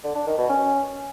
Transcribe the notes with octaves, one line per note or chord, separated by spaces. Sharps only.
D3
D4
D#3
B2
C#4